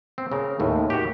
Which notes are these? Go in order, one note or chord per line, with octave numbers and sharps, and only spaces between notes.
C4
C#3 A#4
D#2 A2
F#4 G4